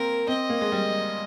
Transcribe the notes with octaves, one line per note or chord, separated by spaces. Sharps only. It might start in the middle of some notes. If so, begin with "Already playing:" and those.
Already playing: A#3 C4 A#4
C4 D#5
A#3
G#3
G3